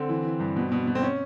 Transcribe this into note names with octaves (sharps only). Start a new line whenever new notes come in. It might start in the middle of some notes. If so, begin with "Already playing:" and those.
Already playing: D3 C4
E3
E3
G2
B2
B2
B2
C4
C#4